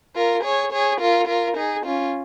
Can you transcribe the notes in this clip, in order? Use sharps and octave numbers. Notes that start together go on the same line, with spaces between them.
F4 A#4
G#4 C#5
G#4 C#5
F4 A#4
F4 A#4
D#4 G#4
C#4 F4